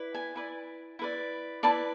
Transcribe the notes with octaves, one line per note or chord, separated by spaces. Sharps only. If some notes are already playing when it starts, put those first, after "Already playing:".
Already playing: E4 B4 D5
G#5
E4 B4 D5
E4 B4 D5
E4 B4 D5 A5